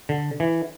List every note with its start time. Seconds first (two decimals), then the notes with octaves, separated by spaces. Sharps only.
0.09 D3
0.40 E3